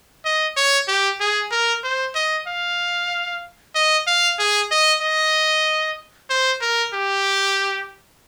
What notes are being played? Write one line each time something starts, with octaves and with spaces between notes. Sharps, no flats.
D#5
C#5
G4
G#4
A#4
C5
D#5
F5
D#5
F5
G#4
D#5
D#5
C5
A#4
G4